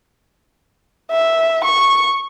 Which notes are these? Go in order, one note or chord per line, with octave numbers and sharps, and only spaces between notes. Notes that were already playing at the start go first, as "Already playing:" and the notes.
E5
C#6